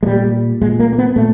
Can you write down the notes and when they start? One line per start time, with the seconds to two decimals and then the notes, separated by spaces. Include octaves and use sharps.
0.03 G#3
0.06 A#2 G3
0.61 A#2 G#3
0.79 A#3
0.93 A#3
0.98 B3
1.16 A#2 A3